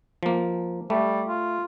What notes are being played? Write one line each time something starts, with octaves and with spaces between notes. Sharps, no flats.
F3 A#3
G3 A3
F4